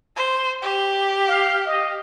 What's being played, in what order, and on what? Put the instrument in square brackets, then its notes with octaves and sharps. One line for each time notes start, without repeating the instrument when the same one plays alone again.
[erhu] C5
G4
[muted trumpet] F5
D#5